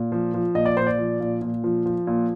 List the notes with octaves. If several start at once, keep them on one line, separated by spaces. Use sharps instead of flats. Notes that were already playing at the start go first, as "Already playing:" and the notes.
Already playing: A#2
F3
F3
A#2 D#5
D5
A#2 C5
D5
F3
A#2
A#2
F3
F3
A#2